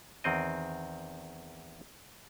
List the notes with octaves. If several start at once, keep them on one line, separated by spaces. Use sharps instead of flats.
E2 D#3 C4 D#5